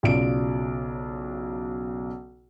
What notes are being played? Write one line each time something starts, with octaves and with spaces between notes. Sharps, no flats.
B1 C#3 F4 D5 D7